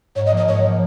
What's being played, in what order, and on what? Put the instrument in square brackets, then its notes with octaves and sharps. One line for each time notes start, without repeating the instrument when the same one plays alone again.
[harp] G#2 [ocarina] C#5
[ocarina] D#5
[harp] F3 A#3
[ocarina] D#5
[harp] G#2 [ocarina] C#5
[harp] F3 A#3